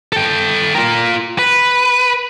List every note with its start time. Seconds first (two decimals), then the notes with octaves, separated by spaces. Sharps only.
0.12 A4 G5
0.75 F4 A#4
1.39 B4